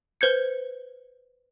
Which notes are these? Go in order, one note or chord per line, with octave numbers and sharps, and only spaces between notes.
B4 C5 G6 G#6 C#7